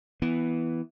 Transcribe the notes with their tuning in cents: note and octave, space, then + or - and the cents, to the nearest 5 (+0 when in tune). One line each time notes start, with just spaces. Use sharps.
E3 +0 B3 +0